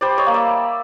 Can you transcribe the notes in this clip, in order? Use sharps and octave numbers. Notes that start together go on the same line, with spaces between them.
G3 C5 D5
C#5 D#5
A#3
D5 E5